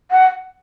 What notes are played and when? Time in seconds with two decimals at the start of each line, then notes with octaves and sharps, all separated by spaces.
0.11 F#5